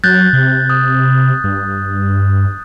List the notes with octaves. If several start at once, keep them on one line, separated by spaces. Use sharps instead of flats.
F#3 F#6 G6 A6
C3
D#6
G2